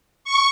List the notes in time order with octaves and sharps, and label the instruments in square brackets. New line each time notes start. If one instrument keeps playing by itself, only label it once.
[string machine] C#6